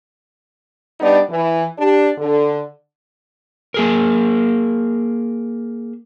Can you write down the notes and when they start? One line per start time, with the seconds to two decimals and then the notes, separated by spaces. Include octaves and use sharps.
1.00 G3 B3 D4 D#4 D5
1.30 E3
1.78 D4 G4
2.18 D3
3.74 A#3 G#4 A#4